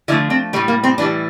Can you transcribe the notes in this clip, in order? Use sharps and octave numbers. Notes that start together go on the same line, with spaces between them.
D3 F3 A3 E4
C4
A2 E3 G3 A3
A#3
C4
A2 E3 G3 D4